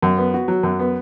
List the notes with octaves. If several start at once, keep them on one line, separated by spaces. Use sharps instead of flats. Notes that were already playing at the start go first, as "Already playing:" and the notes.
F#2
B3
F#4
F#3
F#2
B3